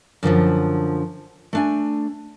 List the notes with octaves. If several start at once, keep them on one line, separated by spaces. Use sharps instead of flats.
F#2 D3 E3 F3
A3 D4 G#5